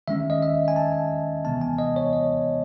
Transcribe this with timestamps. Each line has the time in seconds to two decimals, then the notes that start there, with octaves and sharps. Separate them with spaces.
0.08 D#3 G#3 C#4 E5
0.30 D#5
0.43 E5
0.68 G#5
0.76 A5
1.44 C3 E3 G#3 B3 A5
1.61 G#5
1.79 D#5
1.96 C#5
2.13 D#5